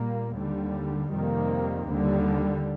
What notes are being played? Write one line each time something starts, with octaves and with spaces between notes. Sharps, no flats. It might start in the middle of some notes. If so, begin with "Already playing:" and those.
Already playing: A#2 G3 A#3
D#2 D3 G3
F2 C3 D#3 G3 A#3
D#2 D3 G3